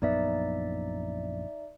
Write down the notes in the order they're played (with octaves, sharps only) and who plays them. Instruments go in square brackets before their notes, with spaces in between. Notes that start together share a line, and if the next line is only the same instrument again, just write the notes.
[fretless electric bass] A#1 F#2 B3 [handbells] D#4 D5 E5